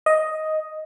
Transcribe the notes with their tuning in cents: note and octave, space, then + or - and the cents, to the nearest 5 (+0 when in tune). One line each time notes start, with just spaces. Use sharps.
D#5 +5